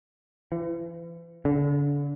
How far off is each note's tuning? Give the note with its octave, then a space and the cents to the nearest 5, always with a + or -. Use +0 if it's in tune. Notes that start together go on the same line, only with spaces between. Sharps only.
E3 +40
D3 -35